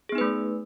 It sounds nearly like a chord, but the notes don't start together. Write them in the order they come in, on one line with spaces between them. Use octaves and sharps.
G#4 B3 D#4 B4 A3